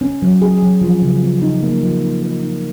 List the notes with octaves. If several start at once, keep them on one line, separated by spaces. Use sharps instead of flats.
C#4
F#3
G#4
F#3
F3
C#3
B3
D#4
A#3
F3
D#4
A#4
D#4